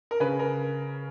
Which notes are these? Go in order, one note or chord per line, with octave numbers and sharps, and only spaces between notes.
A#4
C#3 B4
A#4